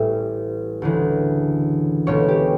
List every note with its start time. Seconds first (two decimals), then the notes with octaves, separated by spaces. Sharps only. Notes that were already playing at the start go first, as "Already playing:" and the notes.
Already playing: A1 A2 G3 E5
0.82 D2 C#3 E3
2.07 C#2 B2 A3 C#4 C#5
2.28 G4